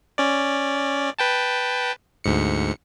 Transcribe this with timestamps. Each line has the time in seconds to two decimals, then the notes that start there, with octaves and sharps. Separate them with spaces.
0.18 C#4 D5
1.19 B4 G5 A5
2.24 D2 G#2 C#7